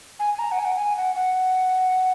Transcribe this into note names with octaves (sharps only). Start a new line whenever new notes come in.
G#5
G#5
A#5
F#5
G#5
F#5
G#5
F#5
F#5